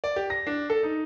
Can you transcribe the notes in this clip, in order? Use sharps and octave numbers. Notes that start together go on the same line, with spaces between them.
D5
G4
A#6
D4
A4
D#4